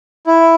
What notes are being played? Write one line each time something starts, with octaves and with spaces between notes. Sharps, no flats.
E4